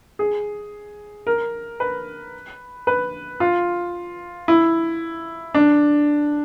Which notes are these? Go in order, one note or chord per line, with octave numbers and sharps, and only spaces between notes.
G#4
A#4
B4
B4
F4
E4
D4